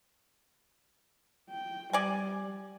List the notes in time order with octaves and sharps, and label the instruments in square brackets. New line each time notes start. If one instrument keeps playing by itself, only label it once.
[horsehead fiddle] G5
[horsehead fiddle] G3 [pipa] D5 G#5